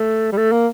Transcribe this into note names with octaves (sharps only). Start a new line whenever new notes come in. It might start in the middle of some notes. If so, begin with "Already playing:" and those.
Already playing: A3
G3
A3
A#3